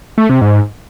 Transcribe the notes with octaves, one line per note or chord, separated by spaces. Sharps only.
A3
C3
G#2